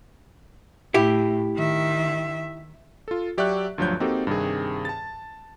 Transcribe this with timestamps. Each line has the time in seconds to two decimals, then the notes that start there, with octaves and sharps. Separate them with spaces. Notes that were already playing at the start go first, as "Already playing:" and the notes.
0.94 A2 E4 G4
1.56 D#3 E5
3.08 F4 A4
3.37 F#3 G4 D5 E5 C#6 F#6
3.78 D2 G2 F3 F#3 C#5 G6
4.00 A#3 C4 D#4 F#4 G4 A4
4.27 G2 C3 D#3 G#4
4.85 A5 A6